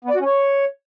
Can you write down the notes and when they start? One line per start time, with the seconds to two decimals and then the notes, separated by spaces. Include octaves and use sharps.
0.05 B3
0.10 D5
0.15 F#4
0.21 C#4
0.26 C#5